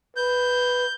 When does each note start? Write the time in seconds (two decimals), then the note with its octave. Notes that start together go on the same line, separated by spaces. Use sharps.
0.17 B4 G6